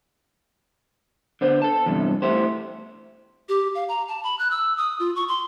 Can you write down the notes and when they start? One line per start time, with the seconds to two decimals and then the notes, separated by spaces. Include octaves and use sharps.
1.41 D3 B3 C5
1.62 A4 A5
1.86 E2 G2 C3
2.22 A3 E4 G4 C5
3.49 G4
3.75 F5
3.89 A#5
4.08 A5
4.24 B5
4.39 F#6
4.51 E6
4.77 D#6
5.00 F4
5.16 C#6
5.28 C6